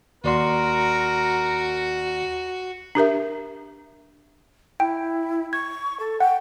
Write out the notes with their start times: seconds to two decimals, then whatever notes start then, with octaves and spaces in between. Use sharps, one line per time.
0.24 D#2 F#4 A#4 D5 C6
2.95 D4 G4 A#4 E5
4.80 E4 G5
5.53 C#6 G#6
6.00 A4
6.21 F#5 G5